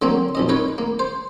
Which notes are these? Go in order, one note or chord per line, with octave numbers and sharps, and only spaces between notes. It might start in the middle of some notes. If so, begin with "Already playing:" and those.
D3 F#3 A#3 C4
B1 F2 D#5
D#4 A#4 B4 C#5
A#3
C5